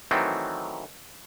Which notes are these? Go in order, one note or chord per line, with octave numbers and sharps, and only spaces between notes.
D#3 E3 F#3 A3 C4